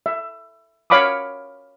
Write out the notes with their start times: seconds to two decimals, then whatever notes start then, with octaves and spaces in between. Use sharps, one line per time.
0.06 E5
0.90 C#5 F5 B5 D6 D#6